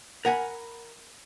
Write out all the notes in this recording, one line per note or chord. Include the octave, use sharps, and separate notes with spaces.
A#4 F#5 G#5 B5